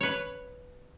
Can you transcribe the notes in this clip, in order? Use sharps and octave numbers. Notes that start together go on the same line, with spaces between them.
B4 C#5